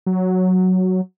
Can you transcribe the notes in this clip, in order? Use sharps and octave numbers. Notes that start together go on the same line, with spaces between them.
F#3